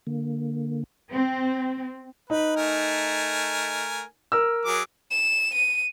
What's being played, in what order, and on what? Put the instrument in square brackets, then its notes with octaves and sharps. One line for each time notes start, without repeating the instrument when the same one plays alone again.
[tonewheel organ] D3 A#3
[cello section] C4
[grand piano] D#4 [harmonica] B4
[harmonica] A3 A#4 G#5
[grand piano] A#4 E6
[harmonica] F#3 G#4 D6
[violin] E7
D#7